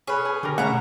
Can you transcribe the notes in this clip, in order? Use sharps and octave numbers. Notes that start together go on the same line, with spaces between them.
C#4 G#4 B4
G#4
D3 D4 G4 A#4
B2 A3 C#4 G#4 F#5 A#5